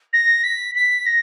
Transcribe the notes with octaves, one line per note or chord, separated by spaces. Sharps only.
A#6
B6
B6
A#6